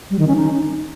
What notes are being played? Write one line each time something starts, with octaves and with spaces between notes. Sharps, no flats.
G3
D#3
C#4
D#4